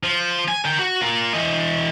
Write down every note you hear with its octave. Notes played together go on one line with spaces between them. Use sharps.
F3
G#5
A#4 G5
F#4
F4 A#4
E3 D#5